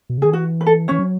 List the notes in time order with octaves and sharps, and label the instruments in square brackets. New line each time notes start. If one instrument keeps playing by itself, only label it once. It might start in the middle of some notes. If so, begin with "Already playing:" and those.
[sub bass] B2
C#3
[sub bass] D#3 [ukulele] G#4
[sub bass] E3 [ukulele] F#4
[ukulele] B4
A4
[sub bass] E3 [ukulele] C#4 C#5
[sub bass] F#3